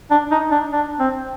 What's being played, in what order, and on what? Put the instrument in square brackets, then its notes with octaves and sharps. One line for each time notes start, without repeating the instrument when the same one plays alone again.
[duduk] D4
D#4
D4
D4
C4